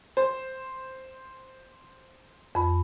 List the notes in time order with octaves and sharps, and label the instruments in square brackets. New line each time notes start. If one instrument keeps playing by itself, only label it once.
[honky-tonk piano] C5
[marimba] F2 B5